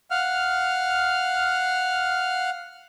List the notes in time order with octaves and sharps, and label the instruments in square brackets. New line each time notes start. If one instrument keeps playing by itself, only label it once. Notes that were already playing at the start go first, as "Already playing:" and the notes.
[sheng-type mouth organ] F5 F#5 F6